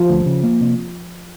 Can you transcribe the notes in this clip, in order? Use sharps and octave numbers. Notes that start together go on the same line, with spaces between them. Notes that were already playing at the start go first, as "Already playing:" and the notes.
Already playing: F3
D2
C#3
A#3
C3